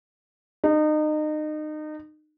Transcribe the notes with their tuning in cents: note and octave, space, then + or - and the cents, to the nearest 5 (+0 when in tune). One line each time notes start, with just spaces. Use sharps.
D#4 -30